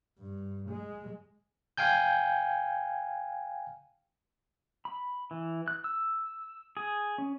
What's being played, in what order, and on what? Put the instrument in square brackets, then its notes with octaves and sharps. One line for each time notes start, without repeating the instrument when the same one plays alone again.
[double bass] G2
G#3
[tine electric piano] F5 G5 G#5 G6
[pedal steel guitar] B5
E3
F#6
E6
G#4
C#4